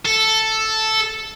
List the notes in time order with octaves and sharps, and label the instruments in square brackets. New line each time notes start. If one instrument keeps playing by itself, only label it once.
[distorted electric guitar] A4